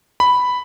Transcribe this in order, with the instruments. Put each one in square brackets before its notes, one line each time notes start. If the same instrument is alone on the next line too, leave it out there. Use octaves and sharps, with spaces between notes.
[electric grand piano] B5